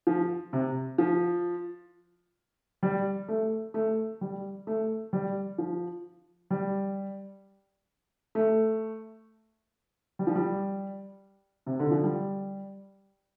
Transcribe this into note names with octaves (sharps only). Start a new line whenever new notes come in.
F3
C3
F3
G3
A3
A3
G3
A3
G3
F3
G3
A3
G3
F3
G3
C3
D3
F3
G3